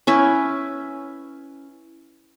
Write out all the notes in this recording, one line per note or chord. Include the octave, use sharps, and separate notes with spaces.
C#4 E4 B4